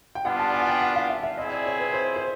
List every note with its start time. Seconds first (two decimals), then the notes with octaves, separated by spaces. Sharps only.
0.15 G5
0.25 G3 B3 D4 F4 F#5
0.39 A5
0.54 G#5
0.61 F#5
0.67 G5
0.82 F#5
0.96 F5
1.09 E5
1.23 E5
1.38 C4 E4 G#4 D#5
1.52 D5
1.66 C#5
1.79 B4
1.93 C5
2.16 C5